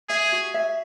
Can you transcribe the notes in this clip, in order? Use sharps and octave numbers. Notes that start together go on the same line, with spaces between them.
G#4 E5
F#4
E5